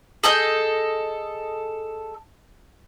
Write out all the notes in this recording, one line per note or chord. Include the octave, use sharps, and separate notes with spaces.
G#4 A4 D#5 G6